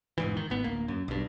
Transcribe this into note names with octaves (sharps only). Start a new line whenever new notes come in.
E1 G#2 E3
D#3
G#1 B3
D1 A#3
F#2
B1 G2